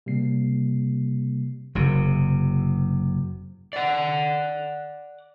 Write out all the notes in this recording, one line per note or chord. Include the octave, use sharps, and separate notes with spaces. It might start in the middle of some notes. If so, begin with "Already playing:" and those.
C3 G3 A#3 C7
F#1 C3
D5 F#5